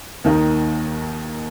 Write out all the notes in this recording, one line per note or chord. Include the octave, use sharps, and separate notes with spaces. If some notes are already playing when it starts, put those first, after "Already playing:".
D#2 D#3 A#3 D#4